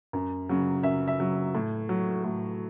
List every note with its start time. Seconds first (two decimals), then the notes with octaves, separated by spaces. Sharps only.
0.13 F#2
0.49 C#3 F#3
0.83 F#2 E5
1.08 E5
1.19 C#3 F#3
1.55 A2
1.89 F#3
2.24 A2